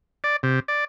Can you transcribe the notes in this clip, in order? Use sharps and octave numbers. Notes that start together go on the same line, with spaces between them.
D5
C3
D5